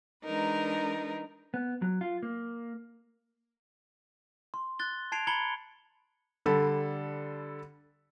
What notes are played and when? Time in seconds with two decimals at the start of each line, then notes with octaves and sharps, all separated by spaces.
0.25 E3 G#3 D4 D#4 A#4 B4
1.54 B3
1.82 F#3
2.01 F4
2.23 A#3
4.54 C6
4.79 F#6 A6 G7
5.12 A5 G#6 C7 D7 F7
5.27 A#5 B5 G#6 C#7 F#7 G7
6.46 D3 G3 A4 B5